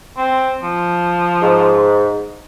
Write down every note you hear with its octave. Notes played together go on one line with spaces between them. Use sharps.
C4
F3
G#2